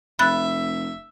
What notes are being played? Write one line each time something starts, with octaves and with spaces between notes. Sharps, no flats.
F1 E5 B5 F#6 A6